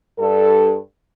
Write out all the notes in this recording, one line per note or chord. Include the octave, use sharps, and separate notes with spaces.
G2 A4